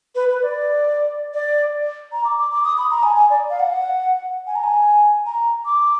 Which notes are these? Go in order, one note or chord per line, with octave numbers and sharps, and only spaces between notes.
B4
B4
D5
D5
A#5
D6
D6
D6
D#6
B5
A#5
G#5
G#5
D5
F5
F#5
G#5
A#5
G#5
A#5
D6